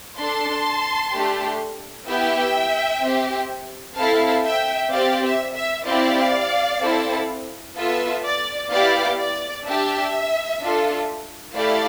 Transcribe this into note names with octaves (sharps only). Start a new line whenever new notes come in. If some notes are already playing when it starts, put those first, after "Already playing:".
D4 A4 A5 C6
A3 D4 G4
B3 E4 G4 E5 G5
C4 G4
C4 E4 A4 F5 A5
E5 G5
C4 G4 D5 F5
E5
E5
C4 E4 G4 D5 F5
C4 E4 A4
B3 F4 A4 E5
D5
B3 E4 G4 D5 F5
D5
D4 G4 E5
D4 F4 A4
A3 E4 G4 D5 F5